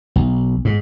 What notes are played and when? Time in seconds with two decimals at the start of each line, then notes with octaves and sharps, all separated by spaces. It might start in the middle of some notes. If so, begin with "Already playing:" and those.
0.16 B1
0.65 G#2